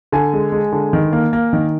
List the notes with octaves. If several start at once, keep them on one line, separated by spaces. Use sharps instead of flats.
D3 G#5
G#3
G#3
D3
D#3
A#3
A#3
D#3